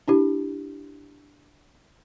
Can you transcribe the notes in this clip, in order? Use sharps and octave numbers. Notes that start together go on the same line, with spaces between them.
D4 E4 G4